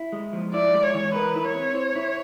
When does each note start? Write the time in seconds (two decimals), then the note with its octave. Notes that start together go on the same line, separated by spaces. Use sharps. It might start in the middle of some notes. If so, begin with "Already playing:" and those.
Already playing: E4
0.12 G#3
0.33 F3
0.54 E4 D5
0.74 G#3
0.83 C#5
0.94 E3
1.14 A#4 B4
1.35 E4
1.45 C#5
1.54 C4
1.75 C5
1.95 E4